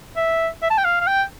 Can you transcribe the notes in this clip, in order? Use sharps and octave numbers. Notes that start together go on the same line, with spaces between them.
E5
E5
A5
G5
F5
F5
G5